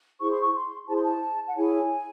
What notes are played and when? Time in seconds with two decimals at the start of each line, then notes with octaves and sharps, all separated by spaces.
0.20 E4 G#4 C5 C#6
0.31 C6
0.41 C#6
0.55 C6
0.88 E4 G#4 C5 A5
0.96 C6
1.02 A5
1.47 F#5
1.56 E4 G#4 C#5 G#5